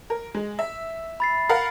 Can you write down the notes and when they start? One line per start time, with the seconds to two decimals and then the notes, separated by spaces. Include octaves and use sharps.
0.10 A#4
0.34 G#3
0.59 E5
1.20 B5 A6 C7
1.49 A#4 F5 F#5